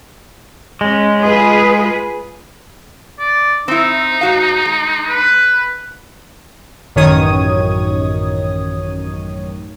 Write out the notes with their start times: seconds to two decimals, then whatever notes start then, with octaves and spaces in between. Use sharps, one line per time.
0.81 G#3 C#4
1.23 F4 G#4 B4
3.19 D5
3.68 C4 D#4 E4
4.21 G#2 F#4 F5
4.65 G#3
5.09 B4
6.96 A1 F#2 D#3 C#5 D#6 G#6